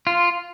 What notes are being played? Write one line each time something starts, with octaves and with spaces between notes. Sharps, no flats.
F4